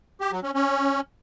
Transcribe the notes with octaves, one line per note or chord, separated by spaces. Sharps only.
G4
F#3
C#4
C#4